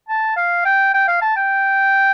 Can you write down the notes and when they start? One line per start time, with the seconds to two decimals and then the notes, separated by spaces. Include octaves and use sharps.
0.08 A5
0.36 F5
0.65 G5
0.94 G5
1.08 F5
1.22 A5
1.36 G5